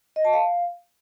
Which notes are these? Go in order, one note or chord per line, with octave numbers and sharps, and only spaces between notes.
D#5
A5
F5